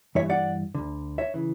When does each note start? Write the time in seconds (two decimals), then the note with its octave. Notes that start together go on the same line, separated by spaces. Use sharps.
0.15 G2 E3 C#5 E5
0.30 D5 F#5
0.75 D2 D3
1.18 C#5 E5
1.34 C#3 E3